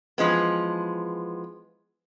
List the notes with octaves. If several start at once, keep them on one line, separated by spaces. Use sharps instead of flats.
E3 F3 G#3 B3